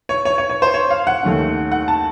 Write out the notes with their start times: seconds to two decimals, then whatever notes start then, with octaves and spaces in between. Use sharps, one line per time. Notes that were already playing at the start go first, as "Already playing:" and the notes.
0.09 C#5
0.25 C#5
0.38 C#5
0.50 C#5
0.62 C5
0.74 C#5
0.90 F5
1.07 F#5
1.23 D#2 D#3 A3 C#4
1.72 F#5
1.88 A5